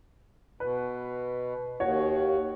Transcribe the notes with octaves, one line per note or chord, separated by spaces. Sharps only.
B2 B4
D#2 F#4 C#5